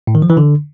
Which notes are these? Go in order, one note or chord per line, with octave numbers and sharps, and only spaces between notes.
A2
D#3
F3
E3
D3